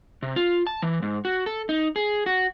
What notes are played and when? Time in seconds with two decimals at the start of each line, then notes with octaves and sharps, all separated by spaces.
0.22 C3
0.36 F4
0.67 A5
0.82 E3
1.02 G#2
1.25 F#4
1.46 A4
1.69 D#4
1.96 G#4
2.26 F#4